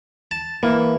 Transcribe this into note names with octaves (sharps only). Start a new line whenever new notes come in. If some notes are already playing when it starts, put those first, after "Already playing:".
A5
E3 A#3